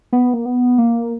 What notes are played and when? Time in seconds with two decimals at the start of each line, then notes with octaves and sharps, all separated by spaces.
0.12 B3
0.34 A#3
0.45 B3
0.78 A#3